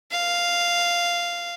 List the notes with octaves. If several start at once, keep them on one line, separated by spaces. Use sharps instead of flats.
F5